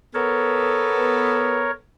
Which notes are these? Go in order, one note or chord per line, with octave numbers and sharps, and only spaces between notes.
B3 A4 A#4 C#5